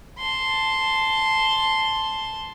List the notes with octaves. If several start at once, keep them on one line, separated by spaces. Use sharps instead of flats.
A5 C6